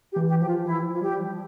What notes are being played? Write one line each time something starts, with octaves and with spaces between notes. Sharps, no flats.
G4
E3
G4
F3 G4
F4
E3 E4
F3
F4
G3 G4
F3